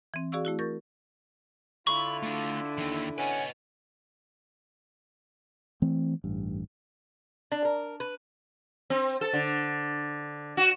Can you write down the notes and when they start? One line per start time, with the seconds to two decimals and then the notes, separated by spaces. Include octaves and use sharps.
0.14 E3 C4
0.32 F#4 G#4 D5 F5 C#6 E6
0.45 A3 E4 F#4
0.59 A#4 C#6 G6 A6
1.87 D3 E4 F4 B5 C#6
2.23 A3 D4
2.78 D#2 D#3
3.18 C#4 B4 D#5 F#5 G#5
5.82 E3 A3 C4
6.24 A1 G2
7.52 D4
7.65 A#4
8.00 B4
8.90 C4
9.21 A4
9.33 D3
10.57 F#4